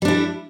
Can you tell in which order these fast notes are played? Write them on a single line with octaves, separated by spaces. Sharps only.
G3 D4 E4